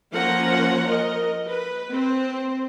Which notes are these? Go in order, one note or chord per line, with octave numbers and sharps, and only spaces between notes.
F3 A#3 C#4 F#5 A#5
A#4 D#5
B4
C4 C5